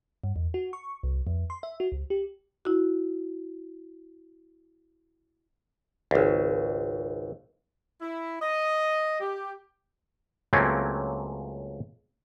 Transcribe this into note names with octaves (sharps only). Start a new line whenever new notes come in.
G2
E2
F#4
C#6
C2
F2
C6
E5
F#4
C#2
G4
E4 F#4
G#1 C#2
E4
D#5
G4
C#2 F#3 A3 A#3 C4 C#4